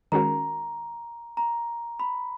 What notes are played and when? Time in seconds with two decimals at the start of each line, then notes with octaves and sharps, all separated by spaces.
0.12 D#3 G#3 C#4 F#4 A#4 A#5
1.37 A#5
2.00 B5